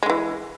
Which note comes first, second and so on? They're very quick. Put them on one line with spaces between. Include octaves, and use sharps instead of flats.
G#3 D3 E3